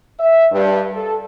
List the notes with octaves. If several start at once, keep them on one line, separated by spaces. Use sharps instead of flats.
E5
G2
A4